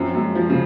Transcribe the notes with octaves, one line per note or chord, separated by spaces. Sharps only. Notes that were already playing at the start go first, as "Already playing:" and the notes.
Already playing: F#2 F3 C4
F#2 G#3
F3 F#4
C#3